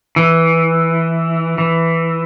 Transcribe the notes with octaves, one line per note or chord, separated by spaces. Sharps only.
E3
E3